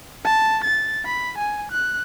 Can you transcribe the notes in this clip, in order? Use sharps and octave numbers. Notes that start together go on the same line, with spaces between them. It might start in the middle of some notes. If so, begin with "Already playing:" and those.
A5
A6
B5
G#5
F#6